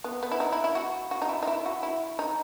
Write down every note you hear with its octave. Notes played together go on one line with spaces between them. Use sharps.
B3
B3
E4
D#4
E4
E4
F#4
F#4
D#4
E4
D#4
E4
F#4
E4
D#4